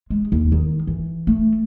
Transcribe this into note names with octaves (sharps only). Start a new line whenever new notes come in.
G#3
D#2
D#3
E3
A3